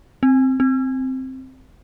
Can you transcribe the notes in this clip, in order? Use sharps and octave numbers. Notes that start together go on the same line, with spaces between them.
C4
C4